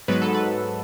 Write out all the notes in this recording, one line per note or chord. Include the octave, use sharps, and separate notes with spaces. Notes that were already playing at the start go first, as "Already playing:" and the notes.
G#2 F#3 B3 B4
A4
B4